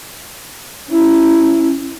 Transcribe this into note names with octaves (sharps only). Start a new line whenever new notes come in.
C#4 E4